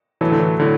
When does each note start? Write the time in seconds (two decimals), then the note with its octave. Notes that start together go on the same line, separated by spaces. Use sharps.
0.21 A2 E3 F#3 A3
0.32 D3
0.40 E3
0.59 A2 D3 F#3